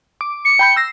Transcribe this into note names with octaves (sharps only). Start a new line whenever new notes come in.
D6
C#7
G5 B5 G6
E6 A#6 C7